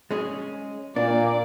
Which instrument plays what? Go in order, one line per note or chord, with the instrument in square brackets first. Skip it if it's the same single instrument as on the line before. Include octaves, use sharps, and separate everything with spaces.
[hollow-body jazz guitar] G#3 C#4 G#4
[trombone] A#2 [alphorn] A#3 [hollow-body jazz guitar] D4 [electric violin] D5